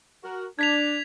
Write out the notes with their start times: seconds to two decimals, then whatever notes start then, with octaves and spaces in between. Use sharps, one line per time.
0.23 F#4 A#4
0.59 D4 G#6 B6 F7